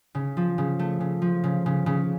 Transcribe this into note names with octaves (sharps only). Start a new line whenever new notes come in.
C#3
F3
C#3
A3
C#3
F3
C#3
C#3
C#3